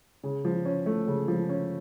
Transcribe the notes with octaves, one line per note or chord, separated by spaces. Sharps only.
C#3
F3
C#4
A3
C#3
F3
C#4